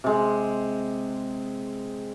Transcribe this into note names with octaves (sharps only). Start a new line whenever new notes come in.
C3 G#3